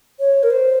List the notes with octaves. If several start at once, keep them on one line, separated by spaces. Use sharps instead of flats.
C#5
A#4
C5